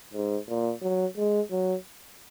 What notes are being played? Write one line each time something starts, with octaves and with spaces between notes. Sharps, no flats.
G#2
A#2
F#3
G#3
F#3